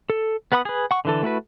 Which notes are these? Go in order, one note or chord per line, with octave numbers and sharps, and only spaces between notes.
A4
B3 B4 F#5 B5 D#6
G#4 B4
F#5 C#6
D3 E3 A4
A3 E4 F#4 B4